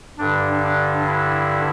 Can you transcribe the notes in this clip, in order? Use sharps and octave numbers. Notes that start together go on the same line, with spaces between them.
G2 D3 D4
D4
E4